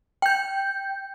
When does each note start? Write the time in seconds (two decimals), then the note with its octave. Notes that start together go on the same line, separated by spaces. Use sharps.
0.22 G5 G6